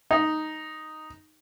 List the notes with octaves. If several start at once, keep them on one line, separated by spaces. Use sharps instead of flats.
D#4